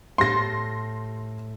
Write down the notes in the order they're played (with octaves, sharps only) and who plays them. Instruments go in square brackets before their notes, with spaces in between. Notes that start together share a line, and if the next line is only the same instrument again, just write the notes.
[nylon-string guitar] A2 G4 A4 [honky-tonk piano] C6 A#6